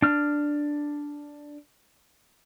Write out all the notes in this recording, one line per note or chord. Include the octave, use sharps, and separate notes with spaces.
D4 F6